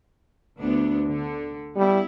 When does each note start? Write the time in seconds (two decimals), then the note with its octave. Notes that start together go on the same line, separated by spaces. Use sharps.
0.59 D2 B3 D4
1.06 D3
1.76 G3 B3 E4